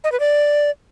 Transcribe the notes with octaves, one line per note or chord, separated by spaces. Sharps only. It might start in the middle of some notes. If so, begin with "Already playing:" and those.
D#5
B4
D5